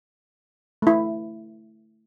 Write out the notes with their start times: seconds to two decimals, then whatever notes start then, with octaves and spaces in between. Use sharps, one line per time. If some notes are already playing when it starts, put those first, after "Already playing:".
0.82 A3 E4